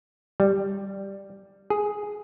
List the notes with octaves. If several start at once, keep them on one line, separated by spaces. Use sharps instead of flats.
G3
G#4